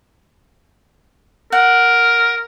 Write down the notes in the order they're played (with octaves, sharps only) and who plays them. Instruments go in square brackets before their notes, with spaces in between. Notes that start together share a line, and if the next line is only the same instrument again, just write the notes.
[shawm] A#4 [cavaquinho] F#5